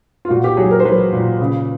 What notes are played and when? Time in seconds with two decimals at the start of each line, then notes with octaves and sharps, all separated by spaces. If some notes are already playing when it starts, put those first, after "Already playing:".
0.25 F4
0.30 A#2 F#4
0.44 G4
0.57 F#3 G#4
0.71 A#4
0.80 C5
0.85 F#3 B4
1.12 A#2
1.40 C#3